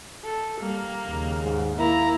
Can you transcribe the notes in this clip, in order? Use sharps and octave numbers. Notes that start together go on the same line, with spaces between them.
A4
G3 A#3
D#2 C#3
G#2
A#3 E4 A#5